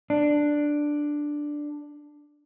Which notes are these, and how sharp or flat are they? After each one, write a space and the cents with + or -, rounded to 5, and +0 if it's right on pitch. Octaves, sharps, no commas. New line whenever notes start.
D4 +5